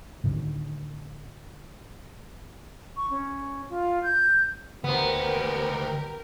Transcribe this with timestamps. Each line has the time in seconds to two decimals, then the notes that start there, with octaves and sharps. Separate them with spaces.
0.24 A2 D3 D#3
2.97 C#6
3.10 C#4
3.70 F4
4.03 G6
4.84 D2 B3 G4 A#4 C5